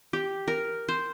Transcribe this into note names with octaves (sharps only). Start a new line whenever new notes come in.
G4
A#4
C5